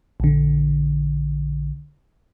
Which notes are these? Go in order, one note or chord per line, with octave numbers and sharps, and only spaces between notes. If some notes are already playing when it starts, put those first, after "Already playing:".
A#1 D3